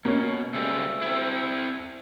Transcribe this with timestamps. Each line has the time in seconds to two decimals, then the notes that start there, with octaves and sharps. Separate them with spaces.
0.05 B2 A#3 C#4
0.54 D2 C#3 G3 G#3 E5 E6
1.02 C4 E4